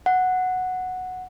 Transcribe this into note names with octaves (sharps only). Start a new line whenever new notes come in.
F#5